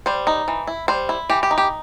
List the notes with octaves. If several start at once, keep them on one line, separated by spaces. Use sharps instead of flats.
G3 C5
D#4
E3
E4
G3 C5
E4
E3 G4
G4
D#4
G4